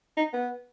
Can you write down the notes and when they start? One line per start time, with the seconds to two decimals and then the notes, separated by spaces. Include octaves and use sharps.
0.17 D#4
0.33 B3